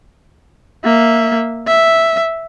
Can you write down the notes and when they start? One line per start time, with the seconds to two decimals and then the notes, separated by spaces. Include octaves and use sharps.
0.84 A#3 E5
1.67 E5